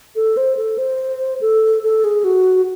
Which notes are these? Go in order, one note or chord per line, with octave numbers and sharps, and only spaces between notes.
A4
C5
A4
C5
A4
A4
G#4
F#4